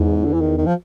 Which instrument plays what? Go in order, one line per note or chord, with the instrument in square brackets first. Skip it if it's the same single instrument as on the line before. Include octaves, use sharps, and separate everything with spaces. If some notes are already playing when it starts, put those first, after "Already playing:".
Already playing: [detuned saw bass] E2 [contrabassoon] G#2
[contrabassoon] D3
E3
D#3
D#3
F3